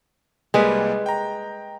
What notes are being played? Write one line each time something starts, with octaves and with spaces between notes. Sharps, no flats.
C2 G3 G#3 A#3 B4
G5 A#5